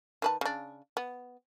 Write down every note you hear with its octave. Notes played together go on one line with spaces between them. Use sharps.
D#3 B4 A5
C#3 D4
B3